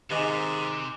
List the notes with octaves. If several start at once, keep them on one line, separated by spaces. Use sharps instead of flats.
G#2 C3 D#3 D#5 G#5 D6 F#6 G7